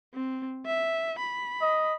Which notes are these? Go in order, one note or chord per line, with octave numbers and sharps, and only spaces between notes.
C4
E5
B5
D#5